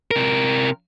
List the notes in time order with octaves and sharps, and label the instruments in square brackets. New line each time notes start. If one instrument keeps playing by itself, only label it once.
[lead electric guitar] C3 A#4